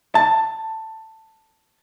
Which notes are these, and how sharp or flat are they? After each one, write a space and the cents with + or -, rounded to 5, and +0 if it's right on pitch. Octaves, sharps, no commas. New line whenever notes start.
A5 +10